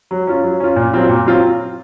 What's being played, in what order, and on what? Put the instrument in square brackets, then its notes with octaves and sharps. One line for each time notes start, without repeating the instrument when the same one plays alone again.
[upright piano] F#3
C#4 F4
F#3
C#4 F4
A#2
F#3 C4 F4
A#2
F#3 C4 F4